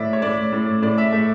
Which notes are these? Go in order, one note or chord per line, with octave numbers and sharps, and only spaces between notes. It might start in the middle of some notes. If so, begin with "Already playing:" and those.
Already playing: A2 D5 E5
C#5
A2 D5
A2
A2 D5
E5
A3 E5